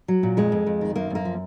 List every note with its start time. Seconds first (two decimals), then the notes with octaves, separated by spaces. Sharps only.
0.08 F#3
0.23 A#2
0.37 F2 G#3
0.52 F2
0.66 F2
0.81 D#3
0.95 F#2 A#3
1.10 F#2 A#3
1.25 F3